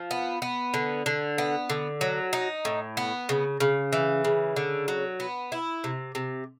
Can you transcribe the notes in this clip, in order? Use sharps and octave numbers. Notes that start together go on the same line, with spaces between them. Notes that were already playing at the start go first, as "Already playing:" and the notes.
Already playing: F3
B3
B3
D3
D3
B3
D3
F#3
D#4
A2
B3
C#3
C#3
E3
C#3
D3
F#3
B3
E4
C3
C3